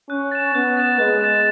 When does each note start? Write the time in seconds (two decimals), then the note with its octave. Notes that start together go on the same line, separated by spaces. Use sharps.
0.09 C#4 F#6
0.31 A6 E7
0.55 B3 F#6
0.77 A6 E7
0.99 G#3 F#6
1.21 A6 E7